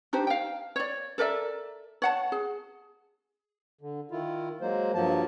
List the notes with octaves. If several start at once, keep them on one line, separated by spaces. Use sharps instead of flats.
D4 D#4 G4 C5
F5 G5
C#5 D5
A4 A#4 D5 E5
C#5 F#5 A5
G#4
D3
D#3 E4 F4
F#3 G#3 A#3 C5
G2 F3 F#3 A#3 A5